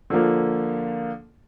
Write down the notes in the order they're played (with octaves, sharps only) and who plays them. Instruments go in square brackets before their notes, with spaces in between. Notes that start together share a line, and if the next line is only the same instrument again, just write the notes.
[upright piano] D3 F3 A#3